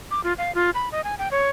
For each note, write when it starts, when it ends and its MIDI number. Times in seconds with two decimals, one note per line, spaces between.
0.11 0.23 86
0.24 0.33 65
0.38 0.54 77
0.55 0.70 65
0.74 0.89 83
0.92 1.04 75
1.04 1.15 80
1.19 1.29 79
1.31 1.50 73